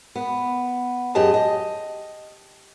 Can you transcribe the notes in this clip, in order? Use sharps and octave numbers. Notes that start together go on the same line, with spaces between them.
B3
F#2 G4 G#4 D#5 A5
D#5